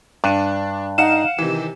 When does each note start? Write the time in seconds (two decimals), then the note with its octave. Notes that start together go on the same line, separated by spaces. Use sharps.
0.24 G2 D4 F#6
0.98 D#4 F5 F#5 E7
1.39 C3 D#3 E3